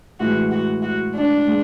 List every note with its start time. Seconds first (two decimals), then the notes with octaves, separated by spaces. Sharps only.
0.20 A2 E3 G#3 F#4
0.51 F#4
0.83 F#4
1.15 D4
1.48 G#3